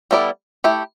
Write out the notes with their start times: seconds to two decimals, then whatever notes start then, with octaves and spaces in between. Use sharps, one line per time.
0.11 G3 B3 E4 A4 D5
0.64 A3 E4 G4